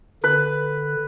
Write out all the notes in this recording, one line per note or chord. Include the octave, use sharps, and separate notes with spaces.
D3 B4